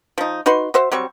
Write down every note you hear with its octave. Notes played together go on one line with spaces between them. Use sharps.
F3 D#4
D#4 F#4 B4 C6
F#4 C5 E5
F#3 G3 C4 C#6